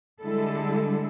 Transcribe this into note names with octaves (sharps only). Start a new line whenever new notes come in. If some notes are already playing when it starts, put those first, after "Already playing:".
D3 G3 G#3 E4 A4